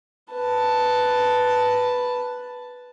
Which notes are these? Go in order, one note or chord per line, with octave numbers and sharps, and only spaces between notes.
B4 A5